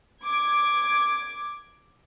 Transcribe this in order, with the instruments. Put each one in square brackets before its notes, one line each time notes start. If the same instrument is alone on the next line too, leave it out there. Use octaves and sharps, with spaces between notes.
[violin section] D6 G#6